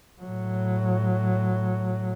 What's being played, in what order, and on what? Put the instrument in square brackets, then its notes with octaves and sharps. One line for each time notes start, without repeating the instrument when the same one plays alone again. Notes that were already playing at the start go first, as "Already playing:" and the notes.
[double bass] A2 F#3